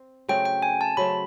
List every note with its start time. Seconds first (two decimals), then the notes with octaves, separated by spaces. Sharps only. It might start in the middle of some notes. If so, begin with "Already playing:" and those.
Already playing: C4
0.28 C#3 F#3 A3 C4 G5
0.45 G5
0.62 G#5
0.81 A5
0.97 C#3 F#3 A3 C4 B5